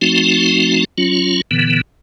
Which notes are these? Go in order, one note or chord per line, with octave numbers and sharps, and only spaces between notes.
F3 A3 C4 D#4 F#4
F#3 C#4 F4
A#2 D3 E3 B3